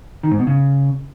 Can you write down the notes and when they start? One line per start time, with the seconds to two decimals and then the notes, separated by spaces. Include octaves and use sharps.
0.23 D#3
0.31 G#2
0.39 B2
0.47 C#3